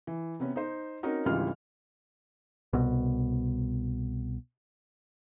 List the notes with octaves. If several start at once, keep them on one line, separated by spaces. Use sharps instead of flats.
E3
C3 B3 C#4
D#4 C5
C4 C#4 D#4 F#4 A#4
G#1 C#2 E3 G3 F4 F6
C2 B2